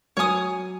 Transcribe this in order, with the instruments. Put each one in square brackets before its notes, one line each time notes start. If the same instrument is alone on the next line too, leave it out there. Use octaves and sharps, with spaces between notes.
[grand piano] F#3 [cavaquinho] C#5 G#5 D#6